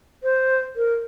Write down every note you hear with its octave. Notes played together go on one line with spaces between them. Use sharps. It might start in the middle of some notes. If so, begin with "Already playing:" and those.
C5
A#4